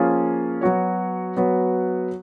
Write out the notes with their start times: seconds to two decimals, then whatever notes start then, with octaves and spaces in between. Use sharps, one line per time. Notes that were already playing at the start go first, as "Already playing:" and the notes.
Already playing: F3 A#3 C#4 F4 G#4
0.61 F#3 B3 F#4 C#5
1.36 F#3 B3 F#4 C#5